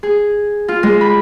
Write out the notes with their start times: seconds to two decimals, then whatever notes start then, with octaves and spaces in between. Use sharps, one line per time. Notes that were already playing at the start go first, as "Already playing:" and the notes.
0.03 G#4
0.68 F4
0.83 G#3
1.01 B5